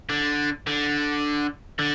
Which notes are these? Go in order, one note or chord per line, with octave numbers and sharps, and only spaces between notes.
D3
D3
D3